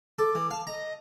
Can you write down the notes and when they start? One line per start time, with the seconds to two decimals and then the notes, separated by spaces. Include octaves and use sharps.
0.19 A4 D6
0.35 E3
0.51 F5 A5
0.67 D#5 A#5